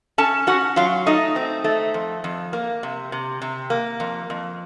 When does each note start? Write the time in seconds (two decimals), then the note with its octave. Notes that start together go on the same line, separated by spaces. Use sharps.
0.18 C#4 A4 A5
0.47 C#4 F#4 F#5
0.76 F#3 F4 F5
1.06 A3 D#4 D#5
1.36 C4
1.64 A3
1.94 F2
2.24 F2
2.53 A#3
2.83 C3
3.12 C3
3.42 C3
3.70 A#3
4.00 F2
4.30 F2